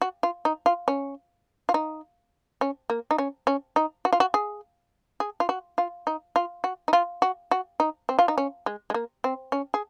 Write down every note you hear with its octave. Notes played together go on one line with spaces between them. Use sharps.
F#4
F4
D#4
F4
C#4
F4
D#4
C#4
A#3
D#4
C#4
C#4
D#4
F#4
F4
F#4
G#4
G#4
F4
F#4
F4
D#4
F4
F#4
D#4
F4
F#4
F#4
D#4
C4
F4
D#4
C#4
G#3
G#3
A#3
C4
C#4
G#4